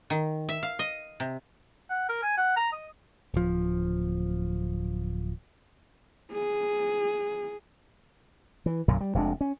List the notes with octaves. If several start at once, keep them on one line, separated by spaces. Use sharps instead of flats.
D#3
E5
F5
D#5
C3
F#5
A#4
G#5
F#5
A#5
D#5
D1 F3
G#4
E3
B1 F#2 A#2 D3
G3
F1 C3 G#3 D4
C#4